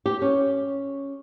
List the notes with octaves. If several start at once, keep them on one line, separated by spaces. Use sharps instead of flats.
G4
C#4